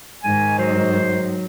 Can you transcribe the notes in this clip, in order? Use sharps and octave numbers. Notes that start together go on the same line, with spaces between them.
G#2 D#3 G#5
F#3 C5